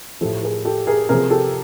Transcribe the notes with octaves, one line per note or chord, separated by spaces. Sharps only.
A2 F3 G4 A4
G#4 A#4
G4 A4
G#4 A#4
C3 F3 G#4 A#4
G4 A4